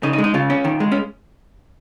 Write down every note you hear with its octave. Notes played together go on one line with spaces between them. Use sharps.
C#3 D#4
D#4
G#3
D#4
C#3 F4
C#4
D#3
G#3
C#4